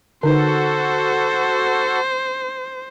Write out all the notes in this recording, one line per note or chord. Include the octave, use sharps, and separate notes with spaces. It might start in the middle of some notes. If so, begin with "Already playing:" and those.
D3 D#4 F#4 A4 B4 C5